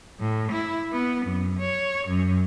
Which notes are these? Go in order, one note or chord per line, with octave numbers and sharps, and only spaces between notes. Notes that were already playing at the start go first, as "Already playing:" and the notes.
A2
E4
B3
F#2
C#5
F#2